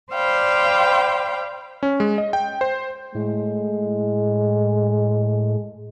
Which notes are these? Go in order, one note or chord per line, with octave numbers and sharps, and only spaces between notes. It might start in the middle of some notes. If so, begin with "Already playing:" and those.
C5 D5 F5 G5 B5
C#4
G#3
D#5
G5
C5
A2 G#3